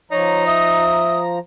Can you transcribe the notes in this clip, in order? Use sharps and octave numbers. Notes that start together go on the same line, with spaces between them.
F3 D#4 C#5 A#5
E5 D#6